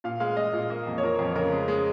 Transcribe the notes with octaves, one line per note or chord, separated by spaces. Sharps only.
A#2 F5
G#3 F5
G#3 D#5
A#2
A#3
F2
C#5
F3 A#4
F2
C#3 A#4
G#3
G#3